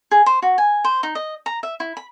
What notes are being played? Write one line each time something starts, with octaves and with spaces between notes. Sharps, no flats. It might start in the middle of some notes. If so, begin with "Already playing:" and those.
G#4
C5
F#4
G#5
C5
D#4
D#5
A#5
E5
E4
B5